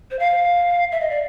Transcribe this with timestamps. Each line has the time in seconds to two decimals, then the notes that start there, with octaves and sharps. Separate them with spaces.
0.11 C5
0.19 F5
0.92 E5
1.01 D#5
1.10 D5